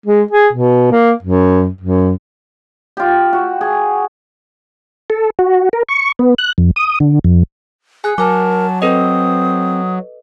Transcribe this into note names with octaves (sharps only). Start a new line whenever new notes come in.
G#3
G#4
B2
A#3
F#2
F#2
F4 G4
F#4
G#4
A4
F#4
A#4
C#6
B3
F#6
F2
D#6
D3
F2
G#4 G#5 F#6
F#3 A#4 G#5 A5 D6
C4 A4 B4 D#5 D#6